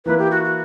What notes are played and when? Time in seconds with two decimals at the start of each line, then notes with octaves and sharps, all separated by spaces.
0.05 E3 A#3 E4 B4
0.19 G4
0.31 F#4
0.44 F#4